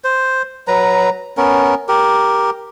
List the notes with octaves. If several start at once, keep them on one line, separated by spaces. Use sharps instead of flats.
C5
F#3 B4 A#5
B3 C#4 A#4
G4 A#4